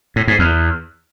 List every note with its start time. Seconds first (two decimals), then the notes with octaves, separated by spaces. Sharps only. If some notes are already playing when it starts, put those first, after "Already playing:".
0.16 A2
0.28 G#2
0.39 E2